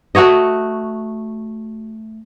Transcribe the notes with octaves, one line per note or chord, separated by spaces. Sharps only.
A3 F#4 C#5 D#5